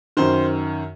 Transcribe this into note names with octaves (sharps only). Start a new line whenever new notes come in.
F#2 D#3 C5